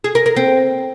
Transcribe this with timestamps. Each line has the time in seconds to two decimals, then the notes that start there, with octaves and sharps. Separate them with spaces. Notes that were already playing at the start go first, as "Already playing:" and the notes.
0.04 G#4
0.15 A#4
0.26 A#4
0.36 C4